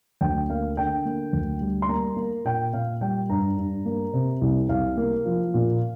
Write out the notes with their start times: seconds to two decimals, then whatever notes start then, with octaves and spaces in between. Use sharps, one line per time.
0.21 D2 G5
0.50 A#3 F5
0.77 D3 G5
1.06 A#3
1.33 D2
1.61 G3
1.82 C6
1.89 A#3 A#5
2.17 A#3
2.45 A#2 G5
2.73 A#2 F5
3.01 G3 G5
3.29 G2 A#5
3.58 G2
3.86 A#3
4.13 C3
4.41 C2
4.69 C2 F5
4.97 A#3
5.25 F3
5.54 A#2